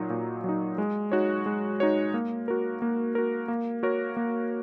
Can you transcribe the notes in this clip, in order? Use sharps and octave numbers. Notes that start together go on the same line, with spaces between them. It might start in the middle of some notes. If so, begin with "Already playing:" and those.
Already playing: A#2 F#3 D#4
A#2
F#3 D#4
G#3
D#4 F#4 C#5
G#3
D#4 F#4 C#5
A#3
F#4 A#4
A#3
F#4 A#4
A#3
F#4 A#4 C#5
A#3